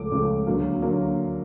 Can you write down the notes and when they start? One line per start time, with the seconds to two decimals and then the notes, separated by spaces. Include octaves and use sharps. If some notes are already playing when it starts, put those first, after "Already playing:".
Already playing: C#2 C#3 F3 A3 D6
0.11 C#2 C#3 F3 A3
0.47 D2 D3 F#3 A#3
0.82 D3 F#3 A#3